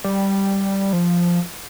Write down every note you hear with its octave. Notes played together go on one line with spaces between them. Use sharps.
G3
F3